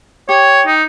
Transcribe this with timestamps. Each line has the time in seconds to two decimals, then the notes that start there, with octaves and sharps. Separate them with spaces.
0.29 G4 C#5
0.67 D#4